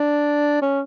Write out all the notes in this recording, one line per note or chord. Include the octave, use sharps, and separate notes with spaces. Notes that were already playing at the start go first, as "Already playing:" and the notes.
Already playing: D4
C#4